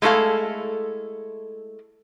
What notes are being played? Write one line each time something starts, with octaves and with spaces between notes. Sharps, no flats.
G#3 A3 E4 A4 F5